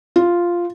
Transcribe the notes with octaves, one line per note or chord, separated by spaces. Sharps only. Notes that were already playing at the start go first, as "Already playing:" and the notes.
F4